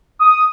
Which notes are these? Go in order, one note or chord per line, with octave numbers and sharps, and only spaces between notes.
D#6